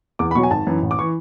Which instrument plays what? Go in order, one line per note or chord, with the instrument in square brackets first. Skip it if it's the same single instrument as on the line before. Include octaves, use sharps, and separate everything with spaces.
[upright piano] E2 D6
B5
B2 C#6
F#3
G#5
G#1 A5
F#2 E3
A1
D6
E3 C#6